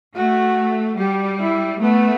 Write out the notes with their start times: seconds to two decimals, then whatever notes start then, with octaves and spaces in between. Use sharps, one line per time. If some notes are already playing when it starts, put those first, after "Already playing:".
0.15 A3 F#4
0.98 G3 G4
1.40 E4
1.80 A3 B3